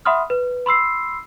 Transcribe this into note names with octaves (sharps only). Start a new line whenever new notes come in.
E5 F#5 B5 C6 D#6 F6
B4
B5 C6 E6 C7